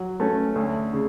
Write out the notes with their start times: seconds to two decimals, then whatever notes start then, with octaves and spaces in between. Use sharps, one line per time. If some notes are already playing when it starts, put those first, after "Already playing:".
Already playing: F#3
0.20 A3 C#4
0.55 D2
0.93 C#3